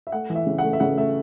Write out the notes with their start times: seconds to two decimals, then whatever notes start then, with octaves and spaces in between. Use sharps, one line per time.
0.07 E5
0.12 A3 F#5
0.30 E3
0.36 E5
0.47 C#3
0.58 A3 F#5
0.73 E5
0.80 C#3 F#5
0.98 A3 E5